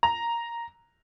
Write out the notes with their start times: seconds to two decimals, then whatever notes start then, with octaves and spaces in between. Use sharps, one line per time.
0.03 A#5